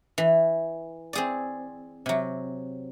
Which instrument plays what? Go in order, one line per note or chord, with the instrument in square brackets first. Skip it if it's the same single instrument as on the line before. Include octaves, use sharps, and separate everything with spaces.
[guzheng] E3
C4 G#4 D5
C3 F#3